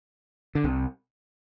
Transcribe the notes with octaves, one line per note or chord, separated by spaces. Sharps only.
D3
C2 C3